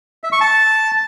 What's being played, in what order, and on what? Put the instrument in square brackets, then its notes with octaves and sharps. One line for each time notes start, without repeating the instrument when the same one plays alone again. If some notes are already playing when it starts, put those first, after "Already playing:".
[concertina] E5
C#6
A5